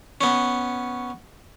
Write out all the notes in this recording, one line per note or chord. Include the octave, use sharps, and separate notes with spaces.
B3 C#4